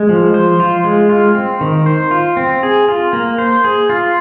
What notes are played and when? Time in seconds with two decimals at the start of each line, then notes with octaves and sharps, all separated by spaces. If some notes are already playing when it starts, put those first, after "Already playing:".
Already playing: G#3
0.09 F3
0.34 C5
0.60 F4
0.84 G#3
1.09 F4
1.35 C4
1.61 D#3
1.86 C5
2.11 F4
2.37 C4
2.63 G#4
2.88 F4
3.13 A#3
3.38 C5
3.64 G#4
3.90 F4